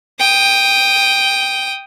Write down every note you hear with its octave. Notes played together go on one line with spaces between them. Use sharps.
G5 D#6